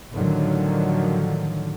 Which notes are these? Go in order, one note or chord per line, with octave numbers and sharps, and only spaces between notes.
A2 D3 D#3 F3 F#3